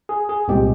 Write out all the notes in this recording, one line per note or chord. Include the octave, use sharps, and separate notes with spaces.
G#4
G#4
C2 A#2 G#3 C4 G4